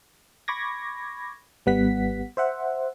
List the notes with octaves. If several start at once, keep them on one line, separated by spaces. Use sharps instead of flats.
B5 C#6 D6 G#6 A#6
G#1 G3 B3 F#5 B6
C5 E5 F#5